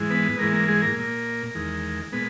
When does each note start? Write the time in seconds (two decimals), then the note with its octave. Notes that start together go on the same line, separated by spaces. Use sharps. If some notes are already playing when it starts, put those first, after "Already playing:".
Already playing: G#2 E3 G#3
0.10 B3 B4
0.39 G#2 E3 G#3 A#3 A#4
0.53 A#3 A#4
0.68 G#3 G#4
0.82 A#3 A#4
0.96 A#2 A#3
1.55 E2 D#3 G#3
2.12 A#2 G#3 B3 B4